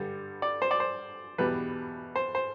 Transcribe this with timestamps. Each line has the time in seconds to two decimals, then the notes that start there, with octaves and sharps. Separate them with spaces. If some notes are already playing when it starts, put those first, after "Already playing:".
Already playing: G2 D3 G3
0.42 D5
0.62 C5
0.71 D5
0.80 C5
1.38 E2 B2 G3 B4
2.16 C5
2.35 C5